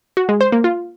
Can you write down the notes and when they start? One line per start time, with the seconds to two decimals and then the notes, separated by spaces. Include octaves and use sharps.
0.17 F#4
0.29 G#3
0.41 C5
0.52 A#3
0.64 F4